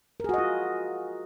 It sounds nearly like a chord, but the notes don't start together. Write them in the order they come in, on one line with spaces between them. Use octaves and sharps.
A#4 G#4 F#4 D#5 F4